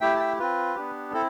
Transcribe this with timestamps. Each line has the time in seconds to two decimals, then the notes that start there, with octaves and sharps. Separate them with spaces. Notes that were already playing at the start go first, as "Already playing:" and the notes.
0.01 A3 E4 G4 E5 G5
0.16 A5
0.20 E5 G5
0.39 C4 F4 B4
0.75 B3 D4 G4
1.13 C4 E4 A4